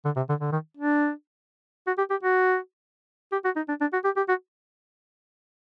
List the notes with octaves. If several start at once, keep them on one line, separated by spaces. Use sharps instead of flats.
D3
C3
D3
D3
D#3
D4
F#4
G4
G4
F#4
G4
F#4
D#4
D4
D4
F#4
G4
G4
F#4